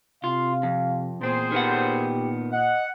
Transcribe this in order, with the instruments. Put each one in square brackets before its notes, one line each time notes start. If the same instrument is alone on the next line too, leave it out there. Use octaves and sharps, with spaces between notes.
[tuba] C3 [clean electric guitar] F4 [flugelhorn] F5
[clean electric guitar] F2
[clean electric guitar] E2 C4 [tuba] A#2 [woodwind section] G#4 C5
[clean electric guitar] D#3 B3 F#5 [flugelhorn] G4
[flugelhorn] D#5 [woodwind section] F#5